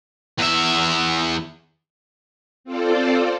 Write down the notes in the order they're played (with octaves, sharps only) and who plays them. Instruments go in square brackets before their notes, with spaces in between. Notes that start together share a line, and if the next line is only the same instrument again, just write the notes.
[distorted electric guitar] E2 E5
[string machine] C4 F4 A4 C5 D5